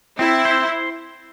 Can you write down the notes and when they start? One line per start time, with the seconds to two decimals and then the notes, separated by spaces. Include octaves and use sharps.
0.19 C4 E4
0.45 C5